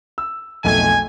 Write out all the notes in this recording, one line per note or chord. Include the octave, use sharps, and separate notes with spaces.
E6
B1 F2 A3 G#5